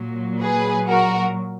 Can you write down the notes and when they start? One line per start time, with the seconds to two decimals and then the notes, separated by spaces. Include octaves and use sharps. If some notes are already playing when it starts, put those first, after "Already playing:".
Already playing: A#2 F#3
0.42 G#4 B4
0.87 F#4 A#4